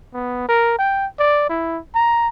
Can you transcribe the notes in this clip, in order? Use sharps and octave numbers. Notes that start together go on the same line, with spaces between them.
B3
A#4
G5
D5
E4
A#5